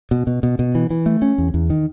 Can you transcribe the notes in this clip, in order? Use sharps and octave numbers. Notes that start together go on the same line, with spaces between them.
B2
B2
B2
B2
E3
E3
A3
C#4
E2
E2
D#3